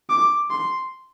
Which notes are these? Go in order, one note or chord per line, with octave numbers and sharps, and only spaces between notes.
D6
C6